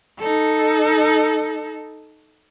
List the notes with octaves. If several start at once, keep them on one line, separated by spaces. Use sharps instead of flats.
D#4 A4